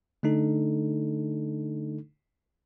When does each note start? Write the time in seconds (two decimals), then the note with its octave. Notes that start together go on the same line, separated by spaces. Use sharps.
0.23 D3 A3 D4 D#4 A4